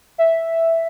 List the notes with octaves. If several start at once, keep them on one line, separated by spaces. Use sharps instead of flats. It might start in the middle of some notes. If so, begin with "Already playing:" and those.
E5